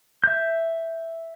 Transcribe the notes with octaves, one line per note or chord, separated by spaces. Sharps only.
E5 G6